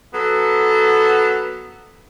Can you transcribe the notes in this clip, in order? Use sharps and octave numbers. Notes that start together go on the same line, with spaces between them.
F#3 B3 A4